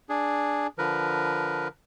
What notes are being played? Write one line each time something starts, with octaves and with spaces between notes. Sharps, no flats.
D4 G#4
D3 F3 A#4 B4